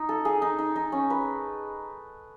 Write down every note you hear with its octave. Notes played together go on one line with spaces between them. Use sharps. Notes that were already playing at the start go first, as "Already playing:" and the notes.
Already playing: D#4
A4
G#4
D#4
D#4
D#4
C#4
B4